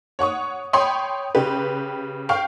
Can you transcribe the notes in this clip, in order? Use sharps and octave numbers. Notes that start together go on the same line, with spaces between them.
C#5 F#5 C#6 D#6
C#5 G5 B5 C6 D#6
C#3 G4 B4
F5 G5 C#6 F6